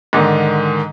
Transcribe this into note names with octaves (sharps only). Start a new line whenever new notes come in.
G#2 D3 D#3